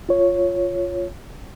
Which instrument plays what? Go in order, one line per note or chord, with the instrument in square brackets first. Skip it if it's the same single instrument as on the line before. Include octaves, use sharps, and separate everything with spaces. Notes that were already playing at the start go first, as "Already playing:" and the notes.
[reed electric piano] F4 C#5